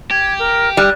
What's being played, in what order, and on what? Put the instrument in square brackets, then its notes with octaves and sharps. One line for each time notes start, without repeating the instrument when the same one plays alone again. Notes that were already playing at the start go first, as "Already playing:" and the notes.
[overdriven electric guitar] G4 [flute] G#6
[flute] A#4
[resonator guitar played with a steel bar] G3 [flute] F#6